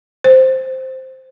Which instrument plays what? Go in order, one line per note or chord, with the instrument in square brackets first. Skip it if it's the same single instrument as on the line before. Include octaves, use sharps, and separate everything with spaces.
[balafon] C5